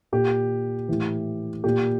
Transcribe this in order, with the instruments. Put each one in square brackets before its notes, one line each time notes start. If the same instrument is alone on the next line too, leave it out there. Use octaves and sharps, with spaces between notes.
[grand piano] A#2 G4
A2 E3
A#2 G4